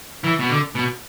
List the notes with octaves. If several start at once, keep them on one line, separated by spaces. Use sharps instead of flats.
E3
B2
D3
B2